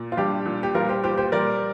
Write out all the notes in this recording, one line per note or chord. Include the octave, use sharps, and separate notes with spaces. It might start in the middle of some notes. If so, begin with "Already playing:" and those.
Already playing: A#2
F4
G3 D4 G4
A#2
G4
G3 F4 A#4
G4 C5
A#2 G4 C5
G4 C5
G3 A#4 D5